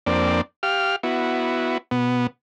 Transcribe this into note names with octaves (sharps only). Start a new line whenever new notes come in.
F2 A#3 C4 D4 D5
G4 F5 F6
B3 E4 F#4
B2 B3